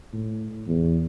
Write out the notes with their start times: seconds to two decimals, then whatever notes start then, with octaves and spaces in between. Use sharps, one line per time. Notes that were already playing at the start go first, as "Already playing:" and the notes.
0.13 A2
0.67 E2